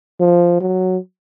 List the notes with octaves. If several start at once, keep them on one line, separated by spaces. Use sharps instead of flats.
F3
F#3